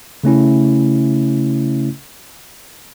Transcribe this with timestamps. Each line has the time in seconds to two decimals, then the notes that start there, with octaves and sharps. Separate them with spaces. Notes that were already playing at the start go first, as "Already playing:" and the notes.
0.24 C#3 A3 C#4 E4